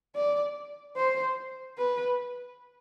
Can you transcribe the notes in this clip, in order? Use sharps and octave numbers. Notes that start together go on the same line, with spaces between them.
D5
C5
B4